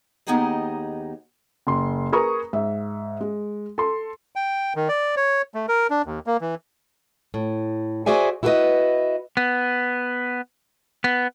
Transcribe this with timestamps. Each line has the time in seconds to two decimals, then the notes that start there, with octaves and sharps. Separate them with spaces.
0.27 D#2 B3 D#4 G4 G#4 D#5
1.67 F#1 C6
2.12 G#4 A#4 B4 A#5 C#6 D#6
2.53 G#2 E5
3.21 G#3
3.78 A4 C6
4.36 G5
4.76 D#3
4.89 D5
5.17 C#5
5.54 A3
5.68 A#4
5.90 D4
6.06 D#2
6.27 A#3
6.41 E3
7.34 A2
8.06 F#4 G#4 C5 D5 E5 G#5
8.43 E4 F#4 G4 A#4 B4 D#5
9.37 B3
11.04 B3